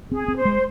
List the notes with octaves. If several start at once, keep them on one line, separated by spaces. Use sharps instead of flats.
C4 G#4
C4
C5
G#3